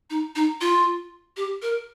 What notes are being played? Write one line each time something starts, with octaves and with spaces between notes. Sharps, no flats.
D#4
D#4
F4
G4
A#4